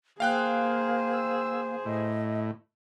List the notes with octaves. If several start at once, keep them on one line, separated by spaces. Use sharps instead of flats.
A#3 G#4 C5 F5 G5 F#6
E6
A2 D#5